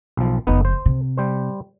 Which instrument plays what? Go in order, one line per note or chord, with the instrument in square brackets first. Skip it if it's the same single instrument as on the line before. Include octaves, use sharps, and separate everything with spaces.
[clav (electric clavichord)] B1 F3
[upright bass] F#1 F2 [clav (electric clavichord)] B3 D#4
[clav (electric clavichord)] C5
[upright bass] C3
[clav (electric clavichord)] G3 C5